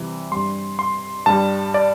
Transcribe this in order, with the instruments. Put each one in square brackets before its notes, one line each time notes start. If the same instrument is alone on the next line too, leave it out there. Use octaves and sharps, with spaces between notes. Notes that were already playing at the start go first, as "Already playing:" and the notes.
Already playing: [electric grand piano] C3 E3 G3
G2 G3 C6
C6
G2 G3 A5
D5